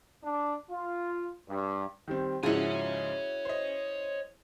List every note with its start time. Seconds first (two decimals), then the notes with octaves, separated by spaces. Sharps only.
0.24 D4
0.71 F4
1.49 G2
2.08 D#3 G3 C4
2.43 G#2 C#3 F3 E4 F#4 G#4 C#5 G#5
3.45 C5 D#5